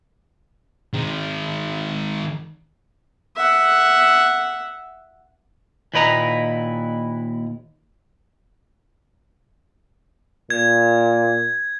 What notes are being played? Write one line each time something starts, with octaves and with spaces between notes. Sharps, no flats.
D#3 G#3
E5 F#5
D#2 A#2 E4 B4 D#5 A#5
A#2 G#6